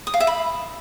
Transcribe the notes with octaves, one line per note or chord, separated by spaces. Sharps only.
D#6
F5
E5
B5